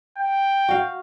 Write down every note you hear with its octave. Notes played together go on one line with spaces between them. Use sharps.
G5
F#4 F5